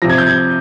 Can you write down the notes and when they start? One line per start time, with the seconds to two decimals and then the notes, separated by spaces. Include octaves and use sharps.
0.02 C3 F3 A#6
0.09 G#6
0.18 G6
0.27 G#6